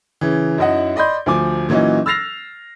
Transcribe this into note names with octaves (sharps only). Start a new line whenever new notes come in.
C#3 E3
F#2 D#4 E4 D#5 F#5
D5 D#5 B5 C6 G6
D2 F3 G#5 D6
A#2 E3 F#3 C#4 D#4
E6 F6 A6 A#6 C7 F7